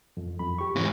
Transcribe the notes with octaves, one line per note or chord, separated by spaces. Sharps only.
F2
F2 B5
G4 C#6
G#2 E3